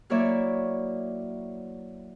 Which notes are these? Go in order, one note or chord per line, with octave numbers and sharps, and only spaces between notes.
F#3 A#3 E4 C#5 D5 E5